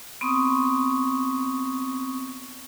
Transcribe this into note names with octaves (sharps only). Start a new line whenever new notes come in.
B3 C4 C#6 D#6